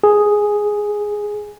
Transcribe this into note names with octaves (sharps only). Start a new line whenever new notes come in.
G#4